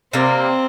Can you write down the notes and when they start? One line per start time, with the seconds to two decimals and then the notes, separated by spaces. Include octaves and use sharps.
0.13 C3 G3 A#3 C4